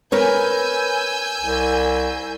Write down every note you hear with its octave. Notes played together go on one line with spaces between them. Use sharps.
A#4 B4 C#5 G#5 E6 G6
C2